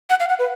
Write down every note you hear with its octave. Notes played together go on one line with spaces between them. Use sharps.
F#5
F5
F#5
B4